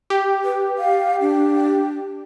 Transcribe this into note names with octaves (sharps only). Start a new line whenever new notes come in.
G4
B4
F5
D4